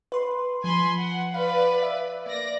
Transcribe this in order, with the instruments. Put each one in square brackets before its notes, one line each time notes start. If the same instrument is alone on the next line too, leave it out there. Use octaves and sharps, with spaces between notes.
[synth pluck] B4 C6
[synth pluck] F3 [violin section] G#5 B5 C6
[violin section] F#5
[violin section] B4 D5 [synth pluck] F5
[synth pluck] E5
[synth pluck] A#3 [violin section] D5 A#6